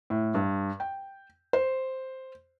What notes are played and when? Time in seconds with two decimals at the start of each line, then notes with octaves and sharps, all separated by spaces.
0.10 A2
0.35 G2
0.80 G5
1.53 C5